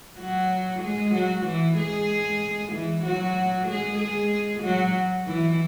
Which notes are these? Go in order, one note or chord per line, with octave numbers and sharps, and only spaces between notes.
F#3 F#4
G#3 G#4
F#3 F#4
E3 E4
G#3 G#4
E3 E4
F#3 F#4
G#3 G#4
G#3 G#4
F#3 F#4
E3 E4